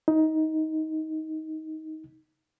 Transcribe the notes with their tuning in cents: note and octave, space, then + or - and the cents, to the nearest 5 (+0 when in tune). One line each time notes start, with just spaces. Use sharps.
D#4 +15